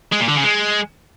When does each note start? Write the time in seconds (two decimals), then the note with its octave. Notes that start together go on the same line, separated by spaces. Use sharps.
0.12 G#3
0.20 A#2
0.28 D3
0.36 C#3
0.43 G#3